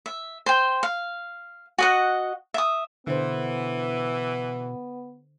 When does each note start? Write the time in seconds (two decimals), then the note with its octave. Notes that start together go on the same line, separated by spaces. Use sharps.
0.06 E5
0.46 C5 G5
0.83 F5
1.78 F#4 D#5 F#5
2.54 E5 D#6
3.07 B2 D3 E3 B3 C5